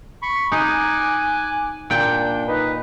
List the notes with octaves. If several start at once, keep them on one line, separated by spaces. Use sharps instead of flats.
B5 C#6
D#4 G#5 D6 F#6
A#2 D4 G5
D#4 B4